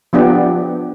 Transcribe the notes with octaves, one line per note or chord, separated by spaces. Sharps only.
F3 B3 D4 G4